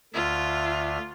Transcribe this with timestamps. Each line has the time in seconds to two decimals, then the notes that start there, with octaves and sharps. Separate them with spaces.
0.14 D2 D3 F4 E5